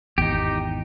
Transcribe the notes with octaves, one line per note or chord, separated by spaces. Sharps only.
G#1 E2 D#4 G4